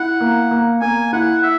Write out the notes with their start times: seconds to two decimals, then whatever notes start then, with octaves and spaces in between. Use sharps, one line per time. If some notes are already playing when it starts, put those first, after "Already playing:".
Already playing: E4 F#5
0.21 A#3
0.51 A#3
0.82 A#3 G#5
1.13 E4 F#5
1.43 E5